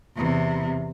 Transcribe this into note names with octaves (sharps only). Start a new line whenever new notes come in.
E2 C3